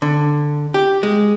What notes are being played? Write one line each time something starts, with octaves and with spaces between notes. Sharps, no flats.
D3
G4
G#3